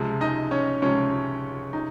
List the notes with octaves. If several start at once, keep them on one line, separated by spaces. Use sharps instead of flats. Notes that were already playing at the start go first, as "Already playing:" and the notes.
Already playing: C#2 C3 F3 G#3
D#4 D#5
C#4 C#5
C#2 C3 F3 G#3 C#4 C#5
C3 D#4